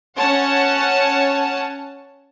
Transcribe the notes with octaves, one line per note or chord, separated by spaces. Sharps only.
C#4 C#5 F#5 A5